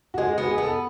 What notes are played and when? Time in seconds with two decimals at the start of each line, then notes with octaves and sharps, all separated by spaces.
0.14 F#4
0.18 G#3 G#4
0.33 B3 F#4
0.48 G#4
0.58 B3 A4